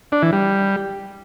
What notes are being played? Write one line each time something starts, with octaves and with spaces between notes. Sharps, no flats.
D4
E3
G3